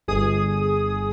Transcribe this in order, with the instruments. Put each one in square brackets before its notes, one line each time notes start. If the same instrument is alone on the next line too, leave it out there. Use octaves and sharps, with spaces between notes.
[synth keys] G1 G#4 D#6